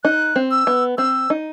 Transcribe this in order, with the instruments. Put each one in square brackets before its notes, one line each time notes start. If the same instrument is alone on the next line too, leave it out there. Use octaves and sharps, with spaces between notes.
[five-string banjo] D#4 [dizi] F#6
[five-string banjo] C4
[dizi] E6
[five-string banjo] B3
[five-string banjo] C4 [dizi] E6
[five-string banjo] D#4